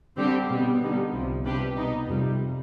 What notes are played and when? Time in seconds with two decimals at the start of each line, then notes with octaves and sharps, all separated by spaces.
0.17 D3 G3 C4 G4
0.49 B2 G3 B3
0.81 D3 G3 B3 D#4
1.13 C2 C3 F3
1.44 C3 G3 D4 G4 B4
1.76 B2 B3 D#4
2.08 F2 C3 G3